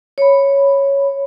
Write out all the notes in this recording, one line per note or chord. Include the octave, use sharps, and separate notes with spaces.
C#5 B5